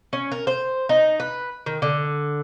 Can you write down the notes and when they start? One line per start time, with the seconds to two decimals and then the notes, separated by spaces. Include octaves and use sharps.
0.13 C#4
0.32 A#4
0.47 C5
0.89 D#4
1.20 B4
1.66 D#3
1.82 D3